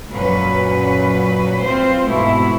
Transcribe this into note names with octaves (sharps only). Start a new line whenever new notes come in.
F#2 A#2 F#3 B4
C4 F4 C5
G#2 B2 A3 E4